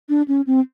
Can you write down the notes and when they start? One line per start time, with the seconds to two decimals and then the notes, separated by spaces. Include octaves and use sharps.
0.09 D4
0.28 C#4
0.47 C4